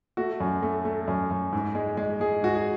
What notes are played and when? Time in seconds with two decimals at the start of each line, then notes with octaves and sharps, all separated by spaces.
0.17 A3 F#4
0.40 F#2
0.62 A3
0.85 A3
1.07 F#2
1.30 F#2
1.53 G#2
1.75 G#3
1.97 G#3
2.20 G#3 G#4
2.42 G#2 F#4
2.55 G#4